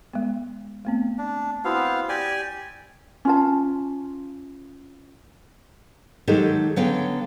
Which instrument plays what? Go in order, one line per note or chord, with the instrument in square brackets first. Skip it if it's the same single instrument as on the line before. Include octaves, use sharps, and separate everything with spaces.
[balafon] G#3 B3
A3 B3 C4
[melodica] D4
[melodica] B3 C4 F5 [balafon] E4 F#4
[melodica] G4 D5 G#5
[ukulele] C#4 F4 A5
[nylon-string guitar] D#3 F#3 G#3 D#4 G4 A4
D3 F#3 B3 C#4 F5 G5